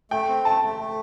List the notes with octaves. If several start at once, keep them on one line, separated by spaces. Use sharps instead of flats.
A3 G5
C4
A3 A5
A3
A3